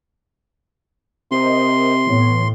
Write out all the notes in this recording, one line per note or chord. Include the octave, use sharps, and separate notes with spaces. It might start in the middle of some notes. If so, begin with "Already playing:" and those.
C3 A#4 C5 D#5 C6
A2 E3 B3 C#5